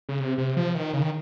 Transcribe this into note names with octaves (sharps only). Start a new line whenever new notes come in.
C#3
C3
C3
F3
D#3
C#3
D#3